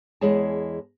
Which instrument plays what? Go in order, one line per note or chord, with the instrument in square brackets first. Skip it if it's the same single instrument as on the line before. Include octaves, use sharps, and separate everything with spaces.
[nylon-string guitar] E2 G#3 E4 G#4 C#5 A5